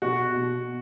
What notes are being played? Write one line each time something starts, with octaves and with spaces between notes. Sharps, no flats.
B2 F#4
B2